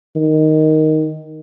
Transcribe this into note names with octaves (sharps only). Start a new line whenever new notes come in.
D#3